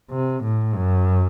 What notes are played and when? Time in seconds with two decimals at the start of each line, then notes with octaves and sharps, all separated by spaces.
0.11 C3
0.43 A2
0.75 F#2